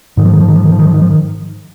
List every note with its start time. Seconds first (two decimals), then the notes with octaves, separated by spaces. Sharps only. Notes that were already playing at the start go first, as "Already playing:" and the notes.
0.17 G#2 D#3
0.25 F3
0.33 D#3
0.40 F3
0.48 D#3
0.56 F3
0.64 D#3
0.72 F3
0.79 D#3
0.87 F3
0.94 D#3
1.02 F3
1.11 D#3